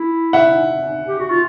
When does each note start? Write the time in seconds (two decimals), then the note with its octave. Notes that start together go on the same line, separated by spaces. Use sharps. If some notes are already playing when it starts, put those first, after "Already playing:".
Already playing: E4
0.33 E5 F#5
1.08 G4
1.19 F#4
1.30 F4